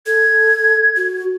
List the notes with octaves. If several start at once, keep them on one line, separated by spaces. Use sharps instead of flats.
A4 G#6
F#4